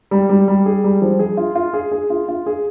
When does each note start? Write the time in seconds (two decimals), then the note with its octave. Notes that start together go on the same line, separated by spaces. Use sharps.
0.11 G3
0.29 G3
0.48 G3
0.66 G#4
0.84 G3
1.02 F3
1.19 G#4
1.37 F4
1.55 F4
1.73 G#4
1.91 G#4
2.10 F4
2.28 F4
2.46 G#4